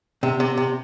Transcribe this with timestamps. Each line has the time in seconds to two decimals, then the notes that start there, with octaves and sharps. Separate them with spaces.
0.23 C3
0.40 C3
0.57 C3